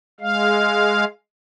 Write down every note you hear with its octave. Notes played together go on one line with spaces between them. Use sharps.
G#3 F5